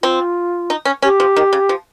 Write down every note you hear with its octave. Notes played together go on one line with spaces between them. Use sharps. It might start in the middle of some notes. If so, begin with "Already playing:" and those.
C4 F4
D#4
C#4
C#4 G4
F3
D#3
C#3
F3